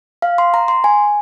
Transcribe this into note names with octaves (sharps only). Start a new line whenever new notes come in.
F5
C6
A#5
C6
G#5